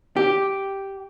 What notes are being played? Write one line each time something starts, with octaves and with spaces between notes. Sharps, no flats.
G4